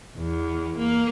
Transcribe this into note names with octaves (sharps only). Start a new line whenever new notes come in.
E2
A#3